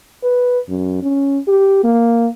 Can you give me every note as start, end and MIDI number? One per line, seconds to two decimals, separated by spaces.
0.24 0.59 71
0.69 1.02 42
1.02 1.39 61
1.48 1.84 67
1.84 2.29 58